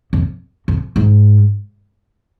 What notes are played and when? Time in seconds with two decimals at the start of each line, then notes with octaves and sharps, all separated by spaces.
0.13 F2
0.68 F2
0.96 G#2